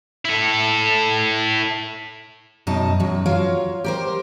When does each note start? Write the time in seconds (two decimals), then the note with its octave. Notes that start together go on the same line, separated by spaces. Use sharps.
0.25 E4 A4
2.67 F#2 B2 D#4 A5
3.00 F#2 F#3
3.26 F#3 F4 C#5 F5
3.84 G4 A#4 C5